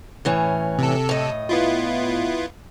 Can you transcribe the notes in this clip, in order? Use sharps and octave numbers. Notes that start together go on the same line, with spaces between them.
A2 E3 C#4
C3 A4
A2 D#5
B3 E4 F4